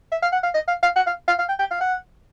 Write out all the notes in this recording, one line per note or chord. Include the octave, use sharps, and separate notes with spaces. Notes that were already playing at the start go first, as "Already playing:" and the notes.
E5
F5
F#5
F5
D#5
F5
F5
F#5
F5
F5
F5
G5
G5
F5
F#5